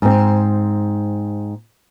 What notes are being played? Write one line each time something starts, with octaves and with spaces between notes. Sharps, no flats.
G#2 C4